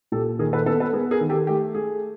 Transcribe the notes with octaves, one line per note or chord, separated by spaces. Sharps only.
A#2 G4 A4
D#3 G#4 A#4
A4 B4
B3 A4 B4
A4 B4
B3 G#4 A#4
G#4 A#4
D#3
G4 A4
A3 G4
A3 G#4